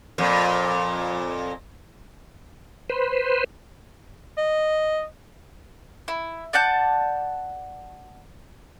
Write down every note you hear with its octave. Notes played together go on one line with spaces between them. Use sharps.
F2 A#2
B4 C5
D#5
E4
D5 F#5 A5 G6